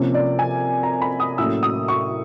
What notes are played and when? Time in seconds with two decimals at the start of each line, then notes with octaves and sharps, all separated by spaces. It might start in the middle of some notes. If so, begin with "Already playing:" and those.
Already playing: C3 F3 A#3 C#4
0.14 D5
0.39 G#5
0.83 A#5
1.02 B5
1.20 D#6
1.38 A2 F#3 A#3 C#4 E6
1.63 D#6
1.88 C#6